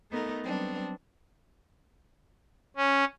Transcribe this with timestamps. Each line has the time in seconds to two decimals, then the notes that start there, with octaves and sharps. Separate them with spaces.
0.11 A3 B3 D#4 A4 A#4
0.44 F#3 G3 B3 C4 D4
2.76 C#4